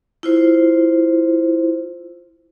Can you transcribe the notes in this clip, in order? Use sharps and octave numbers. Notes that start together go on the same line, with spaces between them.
E4 F4 C5